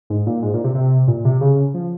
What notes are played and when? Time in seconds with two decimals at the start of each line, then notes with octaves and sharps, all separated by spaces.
0.10 G#2
0.26 A#2
0.42 G#2
0.54 A#2
0.64 C3
0.75 C3
1.08 A#2
1.25 C3
1.41 C#3
1.74 F3